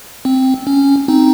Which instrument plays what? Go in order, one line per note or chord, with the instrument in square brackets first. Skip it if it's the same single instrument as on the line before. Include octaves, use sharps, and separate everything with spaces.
[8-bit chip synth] C4
C#4
C4 D#4